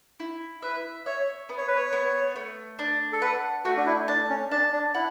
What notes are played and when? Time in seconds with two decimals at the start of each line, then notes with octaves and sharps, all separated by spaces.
0.20 E4
0.62 B4 E5
1.06 C#5 E5
1.49 B3
1.58 C#5
1.68 B4
1.76 C#5
1.93 B3
2.36 A3
2.79 D4
3.13 A4
3.22 B4 F#5
3.65 A3 F#4
3.77 D4
3.86 E4
4.08 D4 A5
4.30 C#4
4.51 D4 A5
4.73 D4
4.94 E4 F#5